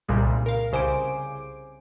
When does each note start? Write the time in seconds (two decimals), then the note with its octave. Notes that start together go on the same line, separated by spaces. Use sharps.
0.08 C2 A#2 C#3 G3 G#3
0.46 A#4 F5
0.72 C2 C#3 C5 G#5 D6 D7